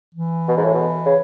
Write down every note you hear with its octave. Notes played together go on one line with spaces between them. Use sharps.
E3
B2
G#2
A2
B2
C#3